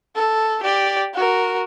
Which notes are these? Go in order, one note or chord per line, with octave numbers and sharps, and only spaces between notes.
A4
G4 D5
F#4 A#4